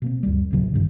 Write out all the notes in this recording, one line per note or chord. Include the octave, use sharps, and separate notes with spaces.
B2 A#3 C4
D2 G2 F#3 G3
A1 D#2 C#3 F#3
G#1 G2 D#3